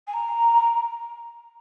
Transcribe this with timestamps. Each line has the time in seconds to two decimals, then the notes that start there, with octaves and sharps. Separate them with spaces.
0.07 G#5
0.13 A#5